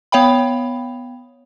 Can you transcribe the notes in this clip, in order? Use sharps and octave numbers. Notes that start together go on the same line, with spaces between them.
B3 C#5 F5 G5 B5